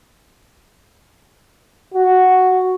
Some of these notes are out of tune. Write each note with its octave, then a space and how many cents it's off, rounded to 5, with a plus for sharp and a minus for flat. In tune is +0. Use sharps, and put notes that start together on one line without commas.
F#4 +0